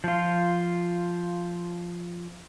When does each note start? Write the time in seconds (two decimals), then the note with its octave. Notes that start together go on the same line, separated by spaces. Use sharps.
0.04 F3 F4